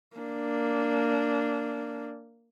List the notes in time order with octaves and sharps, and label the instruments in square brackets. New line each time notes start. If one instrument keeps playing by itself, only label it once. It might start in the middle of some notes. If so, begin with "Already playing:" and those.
[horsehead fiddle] A#3 D4